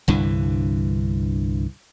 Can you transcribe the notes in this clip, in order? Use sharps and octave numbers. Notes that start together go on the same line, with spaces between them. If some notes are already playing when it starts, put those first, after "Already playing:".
C2 G2 D3 E3